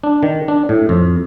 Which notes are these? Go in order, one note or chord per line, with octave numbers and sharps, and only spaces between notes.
D4
D#3
D4
A2
F2